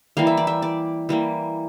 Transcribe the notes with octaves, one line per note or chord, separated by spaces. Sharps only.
E3 G3 A#3 F5
E5
D5
E5
D5
E3 G3 A#3